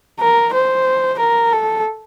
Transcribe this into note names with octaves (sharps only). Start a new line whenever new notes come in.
A#4
C5
A#4
A4